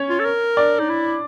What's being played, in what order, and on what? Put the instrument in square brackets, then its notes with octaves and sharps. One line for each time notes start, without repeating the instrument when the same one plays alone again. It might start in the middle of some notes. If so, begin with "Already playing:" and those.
Already playing: [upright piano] C#4 C#5
[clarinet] F4
A4
A#4
[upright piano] D4 D5
[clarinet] D#4
E4